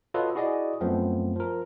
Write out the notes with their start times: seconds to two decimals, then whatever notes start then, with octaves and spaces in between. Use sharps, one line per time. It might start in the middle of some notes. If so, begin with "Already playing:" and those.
0.14 F4 F#4 A4 B4 C#5 D#5
0.35 E4 F#4 G#4 D5 D#5
0.81 F#2 F3 A3 B3 C4
1.36 F3 A#4